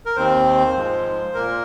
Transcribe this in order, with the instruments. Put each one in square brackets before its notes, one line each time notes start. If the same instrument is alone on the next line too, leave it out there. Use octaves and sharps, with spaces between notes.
[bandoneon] A#4
D#2 D#3 C4 C5
G#2 F3 G#3
A#2 A#3 A#4